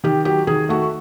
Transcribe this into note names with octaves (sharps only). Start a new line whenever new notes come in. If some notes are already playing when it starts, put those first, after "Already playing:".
D#3 G4
F#3 G4
D#3 G#4
A3 F#4